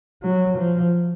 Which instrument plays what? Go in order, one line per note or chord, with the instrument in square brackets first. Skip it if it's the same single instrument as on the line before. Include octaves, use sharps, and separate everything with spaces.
[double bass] F#3
F3